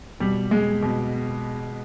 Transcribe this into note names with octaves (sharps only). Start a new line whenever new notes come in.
B2 G3
G#3
B2